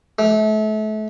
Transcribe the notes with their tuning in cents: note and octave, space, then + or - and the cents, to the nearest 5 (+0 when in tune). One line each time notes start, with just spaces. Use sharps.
A3 -35